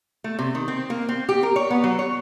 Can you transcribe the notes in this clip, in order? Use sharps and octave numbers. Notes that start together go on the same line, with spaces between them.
A3
C3
D#3
C4
A#3
C4
G4
A#4
C#5
B3
F#3
C#5